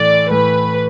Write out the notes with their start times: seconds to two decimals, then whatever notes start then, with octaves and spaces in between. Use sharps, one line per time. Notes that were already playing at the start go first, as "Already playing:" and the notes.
Already playing: A2 E3 A3 D5
0.31 A2 E3 A3 B4